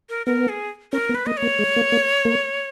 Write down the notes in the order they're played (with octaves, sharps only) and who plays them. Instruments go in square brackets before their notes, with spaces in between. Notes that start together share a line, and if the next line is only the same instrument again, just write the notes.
[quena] A#4
[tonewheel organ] B3 [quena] A#4
[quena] G#4
[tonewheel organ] C#4 [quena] A#4
[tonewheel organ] B3
[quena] B4
[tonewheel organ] A#3 [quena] D#5
[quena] C#5
[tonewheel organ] A#3
G#3
A#3
A#3
A#3